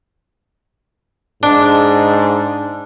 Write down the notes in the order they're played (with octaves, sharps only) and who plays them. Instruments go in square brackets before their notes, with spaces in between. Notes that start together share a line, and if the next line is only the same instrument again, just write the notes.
[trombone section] G#2 [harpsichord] D4